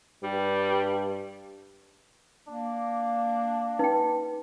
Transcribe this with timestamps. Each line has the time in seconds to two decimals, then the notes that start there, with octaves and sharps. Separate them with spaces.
0.23 G2 G3
2.48 A#3 D4
3.79 D#4 B4 G5